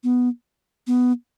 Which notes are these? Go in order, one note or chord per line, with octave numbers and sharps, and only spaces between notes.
B3
B3